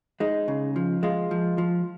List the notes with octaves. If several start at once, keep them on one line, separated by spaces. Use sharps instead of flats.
G#3 D#4
C#3
F3
G#3 F4
F3
F3